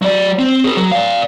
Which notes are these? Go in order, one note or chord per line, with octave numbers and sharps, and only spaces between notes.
F#3 D5
C4
G#4 A#4
F#3
D5 F5